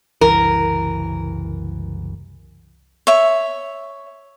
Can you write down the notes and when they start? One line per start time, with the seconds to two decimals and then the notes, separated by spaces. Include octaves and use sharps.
0.21 F#1 C2 E3 A#4
3.07 C#5 E5